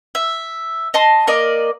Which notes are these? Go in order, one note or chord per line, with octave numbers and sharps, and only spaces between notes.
E5
D#5 A5 C6
A#3 A#4 D5 D#5